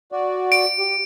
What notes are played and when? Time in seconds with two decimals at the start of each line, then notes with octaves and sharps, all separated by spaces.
0.12 F#4 D5
0.52 D7
0.79 G4